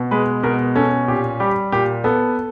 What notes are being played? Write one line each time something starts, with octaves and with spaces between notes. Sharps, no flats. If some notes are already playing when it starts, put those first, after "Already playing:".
Already playing: B2
G#3 B4
B2 A#4
C#4 A4
A#2 G4
G3 G4
A#2 G4
B3 A4